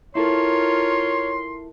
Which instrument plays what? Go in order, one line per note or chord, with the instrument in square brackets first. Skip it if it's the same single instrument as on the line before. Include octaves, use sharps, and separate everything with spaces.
[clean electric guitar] E4 A4 [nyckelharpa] F4 A#4 [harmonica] C#5 [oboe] C6